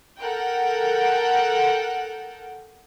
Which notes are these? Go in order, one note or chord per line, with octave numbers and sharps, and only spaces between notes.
A4 A#4 F#5 G5